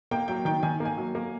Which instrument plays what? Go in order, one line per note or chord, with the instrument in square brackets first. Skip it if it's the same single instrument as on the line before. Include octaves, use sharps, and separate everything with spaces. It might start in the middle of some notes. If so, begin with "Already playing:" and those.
[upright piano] A#3 G5
F#3 G5
D#3 G5
D#3 G#5
A#3
G#5
F#3
A#3